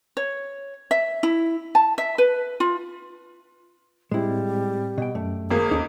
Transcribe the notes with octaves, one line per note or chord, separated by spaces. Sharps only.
C#5
E5
E4
A5
E5
B4
F4
A2 G3 G#3 C4 E4
B2 G5
F#2 A3
G#1 A#3 G#4
D#2 C#4 D#4 A4